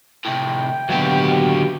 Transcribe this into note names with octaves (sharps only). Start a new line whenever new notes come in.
A2 C3 G5
D#2 B2 D3 F#3 G4